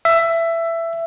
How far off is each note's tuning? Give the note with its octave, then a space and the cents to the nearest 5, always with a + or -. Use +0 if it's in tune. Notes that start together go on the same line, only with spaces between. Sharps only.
E5 +15